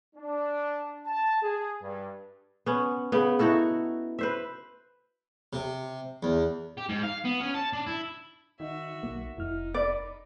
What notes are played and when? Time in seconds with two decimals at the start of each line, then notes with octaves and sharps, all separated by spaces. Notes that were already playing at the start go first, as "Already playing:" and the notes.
0.16 D4
1.06 A5
1.42 G#4
1.82 G2
2.66 B3 C#4
3.12 C#3 B3
3.39 D#4 E4 F#4 A4
4.19 B4 C5 E5
5.53 C3
6.23 E2
6.78 G4
6.89 G#2
7.04 F5
7.25 B3
7.41 C#4
7.54 A5
7.73 D4
7.86 E4
8.60 D#3 D#4 F#4 E5
9.03 B1 A#3
9.38 F1 D#4 E4 F6
9.74 D5 B5